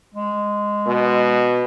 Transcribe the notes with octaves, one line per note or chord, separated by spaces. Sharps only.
G#3
B2